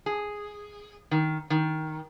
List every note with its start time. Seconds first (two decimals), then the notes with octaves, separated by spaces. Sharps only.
0.06 G#4
1.11 D#3
1.50 D#3